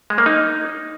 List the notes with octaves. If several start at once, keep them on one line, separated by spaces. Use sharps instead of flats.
G#3
A#3
D#4